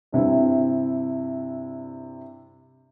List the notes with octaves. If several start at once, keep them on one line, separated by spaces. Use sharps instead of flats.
G2 C3 E4